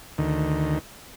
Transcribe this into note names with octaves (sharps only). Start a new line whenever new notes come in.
D2 D#3